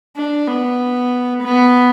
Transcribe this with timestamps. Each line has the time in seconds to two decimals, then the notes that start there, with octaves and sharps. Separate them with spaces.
0.17 D4
0.48 B3
1.43 B3